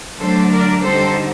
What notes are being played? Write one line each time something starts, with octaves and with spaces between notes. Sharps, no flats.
D3 F#3 A3 D4 A4 C5
A#4 D5
D3 G3 C4 D#4 A4 C5